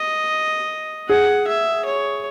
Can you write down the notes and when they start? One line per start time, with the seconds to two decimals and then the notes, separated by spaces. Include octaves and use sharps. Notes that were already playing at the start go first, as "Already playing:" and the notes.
Already playing: D#5
1.09 G#4 F#5
1.48 E5
1.86 C#5